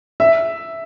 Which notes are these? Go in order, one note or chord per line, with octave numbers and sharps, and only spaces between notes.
E5